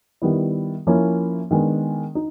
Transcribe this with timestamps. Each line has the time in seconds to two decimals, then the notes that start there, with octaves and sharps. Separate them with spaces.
0.22 D#3 G3 B3 E4
0.87 F3 A#3 C#4 E4
1.51 D#3 G#3 B3 D4
2.15 D#4